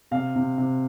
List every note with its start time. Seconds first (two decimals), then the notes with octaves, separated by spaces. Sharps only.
0.11 C3 F5
0.36 C3
0.58 C3